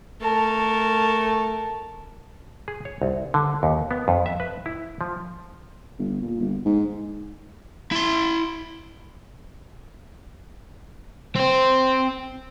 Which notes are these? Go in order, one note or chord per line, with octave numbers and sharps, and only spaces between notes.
A3 A#4 A5
G#4
C#5
C2
D3
D#2
B3
F2
E5
B4
E4
F3
G1
A#2
G1
G#2
E4 C6
C4 C5